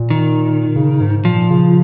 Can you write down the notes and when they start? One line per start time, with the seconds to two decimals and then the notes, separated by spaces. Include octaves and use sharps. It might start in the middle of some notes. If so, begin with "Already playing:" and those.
Already playing: A#2
0.10 D#3
0.76 C#3
1.01 G#2
1.25 A#2 F3
1.50 C#3